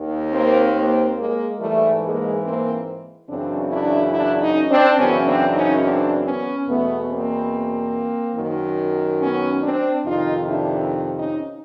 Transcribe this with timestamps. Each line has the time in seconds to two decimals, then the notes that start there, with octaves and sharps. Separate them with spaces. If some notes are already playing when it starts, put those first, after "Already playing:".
Already playing: D#2 D#3
0.33 A#3 C4
0.75 A#3 C4
1.18 G#3 A#3
1.60 G#2 E3 G3 A3
2.02 G#3 A#3
2.44 A#3 C4
3.29 F#2 C#3 E3 C4 D4
3.72 D4 E4
4.13 D4 E4
4.42 C#4 D#4
4.70 C4 D4
4.98 F#2 C#3 E3 B3 C#4
5.26 C4 D4
5.54 C#4 D#4
5.83 C4 D4
6.24 B3 C#4
6.67 E2 B2 A3 B3
7.10 A#3 C4
8.36 F#2 D#3
9.20 B3 C#4
9.62 C4 D4
10.05 F2 C3 D#3 D#4 F4
10.48 D4 E4
11.18 C#4 D#4